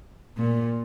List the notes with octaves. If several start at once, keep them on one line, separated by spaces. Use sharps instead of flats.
A#2